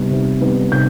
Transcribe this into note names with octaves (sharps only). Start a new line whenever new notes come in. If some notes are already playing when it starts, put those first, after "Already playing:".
Already playing: C3 G3 B3 D#4
C3
G3 B3 D#4
C3 G6